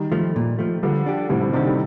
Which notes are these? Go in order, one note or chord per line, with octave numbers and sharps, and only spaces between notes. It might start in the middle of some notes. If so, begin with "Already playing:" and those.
Already playing: D#3 G3
F3 A3
A#2
F3 A3
D3 F3 G3
D4 G4
A2 C3 G3
A2 C3
C3 D#3 D4 G4
D#3 G3